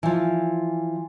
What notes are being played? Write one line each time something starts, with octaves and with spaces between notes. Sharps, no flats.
E3 F3